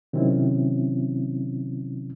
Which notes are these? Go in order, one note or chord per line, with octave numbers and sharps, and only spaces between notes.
C3 D#3 F#3 C4 C#4 E4